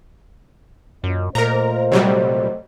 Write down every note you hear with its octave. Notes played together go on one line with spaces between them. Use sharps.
F#2 A#2 C#4 D#5
A#2 A3 A#4 C5 D#5 A#5
C3 F#3 G3